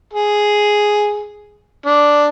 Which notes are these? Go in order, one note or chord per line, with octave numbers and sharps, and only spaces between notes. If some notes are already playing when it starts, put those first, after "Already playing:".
G#4
D4